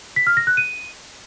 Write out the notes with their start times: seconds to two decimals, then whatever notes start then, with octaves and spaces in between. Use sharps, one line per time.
0.16 B6
0.27 F6
0.37 A#6
0.47 F#6
0.57 D#7